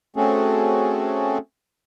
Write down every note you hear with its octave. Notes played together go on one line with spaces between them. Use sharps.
A3 C4 C#4 F#4 G#4 A4